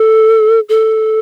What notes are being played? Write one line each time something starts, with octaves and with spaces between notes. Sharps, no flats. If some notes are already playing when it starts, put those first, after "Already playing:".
Already playing: A4
A4